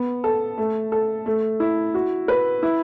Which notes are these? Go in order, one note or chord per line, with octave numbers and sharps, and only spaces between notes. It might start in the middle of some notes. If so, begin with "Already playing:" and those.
Already playing: B3
A4
A3
A4
A3
E4
F#4
B4
E4